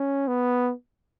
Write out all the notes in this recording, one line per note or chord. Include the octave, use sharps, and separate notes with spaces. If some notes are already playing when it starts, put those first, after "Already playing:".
Already playing: C#4
B3